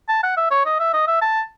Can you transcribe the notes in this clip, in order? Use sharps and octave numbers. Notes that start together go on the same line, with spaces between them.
A5
F#5
E5
C#5
D#5
E5
D#5
E5
A5